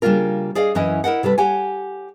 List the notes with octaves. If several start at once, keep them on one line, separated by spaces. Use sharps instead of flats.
C#3 G3 A#3 D4 F4 A#4
G#4 D5 D#5 F5
F#2 E3 C#4 E4 D#5
E4 A#4 D#5 F#5
C3 G3 A4 B4
G4 C#5 F#5 G#5